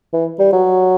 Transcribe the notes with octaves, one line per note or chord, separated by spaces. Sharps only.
E3
G3
F#3